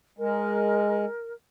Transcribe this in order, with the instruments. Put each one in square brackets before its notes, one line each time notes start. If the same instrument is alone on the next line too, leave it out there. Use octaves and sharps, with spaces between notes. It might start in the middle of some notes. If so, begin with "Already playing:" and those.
[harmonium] G#3 [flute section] A#4